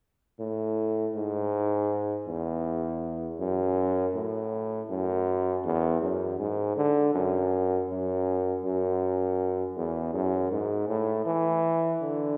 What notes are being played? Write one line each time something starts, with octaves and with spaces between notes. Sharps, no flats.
A2
G#2
E2
F#2
A2
F#2
E2
F#2
G#2
D3
F#2
F#2
F#2
E2
F#2
G#2
A2
E3
D3